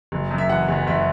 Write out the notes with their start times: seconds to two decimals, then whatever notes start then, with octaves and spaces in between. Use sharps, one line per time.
0.12 F#1
0.31 F#2
0.38 E5
0.49 E3 F#5
0.68 F#1
0.87 F#1 E5